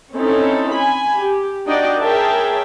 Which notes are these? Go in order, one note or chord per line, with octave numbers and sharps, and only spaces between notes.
C4 C#4 D#4 E4 A4
G#5 B5
G4
D4 D#4 F#4 D5 D#5 G5
G#4 A#4 C#5 E5 G5 A5